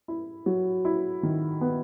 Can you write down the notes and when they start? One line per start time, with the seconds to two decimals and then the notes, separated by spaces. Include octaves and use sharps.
0.08 E4
0.46 F#3
0.85 E4
1.23 D#3
1.61 B3